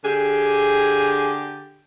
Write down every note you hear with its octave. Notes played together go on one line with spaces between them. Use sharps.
D3 G4 G#4